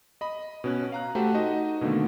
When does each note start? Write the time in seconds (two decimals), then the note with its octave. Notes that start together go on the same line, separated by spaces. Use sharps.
0.21 D#5 B5
0.64 B2 C#4 F#6
0.92 F5 A#5 F#6
1.15 A3 F#4 G4 C5 A5
1.34 D#4 F#4 D#5
1.81 B2 D3 D#3 A3 A#3